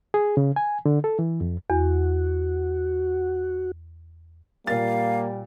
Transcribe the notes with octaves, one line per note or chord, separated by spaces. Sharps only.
G#4
C#3
G#5
D3
A4
E3
F2
E2 F#4
A#2 G3 A#3 A#4 F5 A6